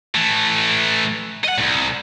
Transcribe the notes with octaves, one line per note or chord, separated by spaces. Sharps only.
E3 A3
D#5 F#5
C2 A#2